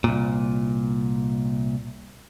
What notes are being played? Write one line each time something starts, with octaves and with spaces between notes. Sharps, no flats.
C2 A#2